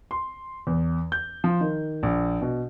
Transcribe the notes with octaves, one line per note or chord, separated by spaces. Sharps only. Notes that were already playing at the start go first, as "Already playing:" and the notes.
C6
E2
G6
F3
D#3
A#1
B2